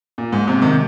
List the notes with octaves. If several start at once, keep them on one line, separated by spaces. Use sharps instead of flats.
A#2
G#2
G#2 C3
C3 D#3